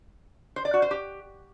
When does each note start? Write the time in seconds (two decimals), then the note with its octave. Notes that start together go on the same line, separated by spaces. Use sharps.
0.56 C5
0.65 D5
0.74 F#4
0.82 C5
0.91 G4